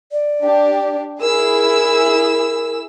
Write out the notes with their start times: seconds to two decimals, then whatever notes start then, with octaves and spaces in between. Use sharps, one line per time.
0.12 D5
0.41 D4 G4
1.21 E4 G#4 A#4 E6